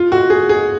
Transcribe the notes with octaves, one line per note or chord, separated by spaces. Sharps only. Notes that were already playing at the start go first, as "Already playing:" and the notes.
Already playing: F4
F#4
G#4
G#4